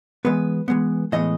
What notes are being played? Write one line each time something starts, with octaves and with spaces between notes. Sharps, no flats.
E3 G#3 B3 B4
E3 G#3 B3
A2 E3 G#3 B3 D#5